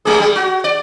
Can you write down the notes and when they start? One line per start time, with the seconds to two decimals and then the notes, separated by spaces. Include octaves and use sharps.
0.05 G3 G#3 G#4
0.20 G3
0.36 F#4
0.64 D5